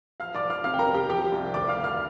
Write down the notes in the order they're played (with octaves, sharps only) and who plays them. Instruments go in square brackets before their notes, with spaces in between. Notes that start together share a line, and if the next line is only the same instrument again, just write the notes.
[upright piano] F3 F5 F6
D5 D6
F3
F5 F6
C3 F5 F6
G5
A#4 A#5
C3
G4 G5
F3 G4 G5
C2
D2 D5 D6
F5 F6
D2
F5 F6